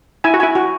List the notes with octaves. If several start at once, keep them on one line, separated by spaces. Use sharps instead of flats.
E4 G#5
F#4
E4 G#5
F#4